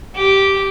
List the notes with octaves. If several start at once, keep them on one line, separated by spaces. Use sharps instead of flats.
G4